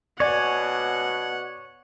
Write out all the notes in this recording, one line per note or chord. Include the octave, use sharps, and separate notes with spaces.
B2 C#5 D5 F#5 G#5